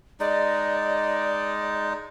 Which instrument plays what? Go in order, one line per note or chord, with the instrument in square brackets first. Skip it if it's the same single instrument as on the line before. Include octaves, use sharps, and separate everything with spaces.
[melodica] G#3 D#4 [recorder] D5